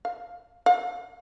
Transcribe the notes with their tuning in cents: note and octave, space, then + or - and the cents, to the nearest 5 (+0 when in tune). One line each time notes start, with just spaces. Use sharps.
F5 +15
F5 +45